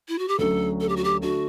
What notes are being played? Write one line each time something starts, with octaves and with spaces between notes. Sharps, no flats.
E4
F#4
G4
D2 D3 F#3 C#4 A4
A4
G4
F#4
G4
D3 A3 F#4